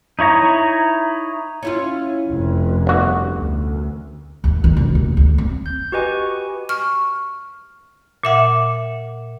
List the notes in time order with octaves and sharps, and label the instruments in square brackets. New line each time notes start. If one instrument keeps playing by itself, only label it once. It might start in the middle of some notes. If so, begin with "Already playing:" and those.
[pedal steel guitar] D#4 E4 C#5 A#5
[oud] C#4 E4 F4
[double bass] F1 F2
[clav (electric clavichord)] G1 F#4
[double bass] D2
[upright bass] D#2
D#3
E1
D#2
D2
C4
[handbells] G6
F#4 G4 B4 D#5 G#5 C#6
[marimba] C#6 F6
A#2 E5 F#5